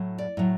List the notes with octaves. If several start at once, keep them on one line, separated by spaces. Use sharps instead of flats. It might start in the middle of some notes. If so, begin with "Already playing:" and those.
Already playing: A2 F#3
D5
A2 F#3